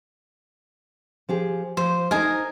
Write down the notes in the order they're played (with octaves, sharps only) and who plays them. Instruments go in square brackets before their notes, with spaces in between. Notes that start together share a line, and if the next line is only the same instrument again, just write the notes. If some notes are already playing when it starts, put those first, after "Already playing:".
[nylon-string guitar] F3 G4 G#4
[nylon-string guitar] F3 [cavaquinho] C5
[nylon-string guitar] D#4 A4 C5 [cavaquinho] A#4 D#5 G#5